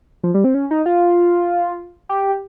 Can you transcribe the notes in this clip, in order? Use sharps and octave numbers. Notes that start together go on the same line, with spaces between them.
F3
G3
C4
C#4
D#4
F4
G4